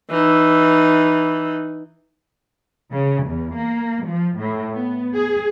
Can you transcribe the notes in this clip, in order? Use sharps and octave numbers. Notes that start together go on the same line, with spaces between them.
E3 D#4
C#3
E2
A#3
F3
A2
B3
G#4